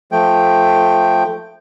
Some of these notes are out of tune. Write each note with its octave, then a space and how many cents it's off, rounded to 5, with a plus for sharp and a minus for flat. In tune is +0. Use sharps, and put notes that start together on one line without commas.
F3 +0 A3 +0 G5 +0